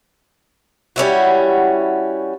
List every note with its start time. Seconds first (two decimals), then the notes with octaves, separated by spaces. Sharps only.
0.96 G3 C#4 E4 F#4